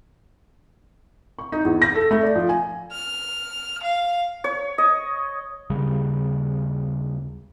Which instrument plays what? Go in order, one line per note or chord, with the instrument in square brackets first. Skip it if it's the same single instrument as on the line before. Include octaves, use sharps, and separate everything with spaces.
[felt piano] C#6
D#4
E2
A#6
A4
A3
D5
F3
G#5
[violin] F6
F5
[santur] C#5
D#5
[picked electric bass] D#2 C#3 G3